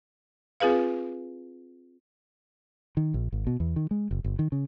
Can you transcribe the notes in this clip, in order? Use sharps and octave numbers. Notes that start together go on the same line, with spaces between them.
C4 F4 G#4 B4 F5
D#3
A#1
G#1
B2
E2
D#3
G#3
F#1
G1
D#3
C#3